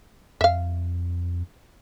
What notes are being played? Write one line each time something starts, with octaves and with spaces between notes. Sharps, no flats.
F2 E5 F5